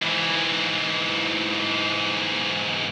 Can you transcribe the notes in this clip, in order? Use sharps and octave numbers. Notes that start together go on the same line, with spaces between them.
G#2 E3